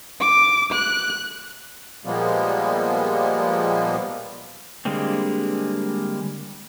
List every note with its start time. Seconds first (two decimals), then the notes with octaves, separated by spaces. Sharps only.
0.20 D6
0.72 F#6
2.05 A#2 F3 G3 G#3 A#3 B3
4.85 D3 G3 G#3 A#3 C4